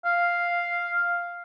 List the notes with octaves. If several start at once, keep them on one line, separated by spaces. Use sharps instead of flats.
F5